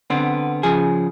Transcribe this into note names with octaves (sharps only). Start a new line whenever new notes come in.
D3 B3 C4
C#3 F3 G#4